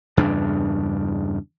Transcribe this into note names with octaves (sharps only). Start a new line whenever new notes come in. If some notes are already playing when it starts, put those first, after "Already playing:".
E2 G2 C#3 D4